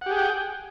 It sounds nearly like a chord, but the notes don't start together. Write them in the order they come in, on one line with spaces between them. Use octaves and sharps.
F#5 G4 G#4 G5